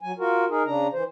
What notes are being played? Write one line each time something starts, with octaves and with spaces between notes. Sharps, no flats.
F#3 G#5
F4 F#4 A#4
D#4 G#4 A#4
C#3 D4 A#5
E3 C5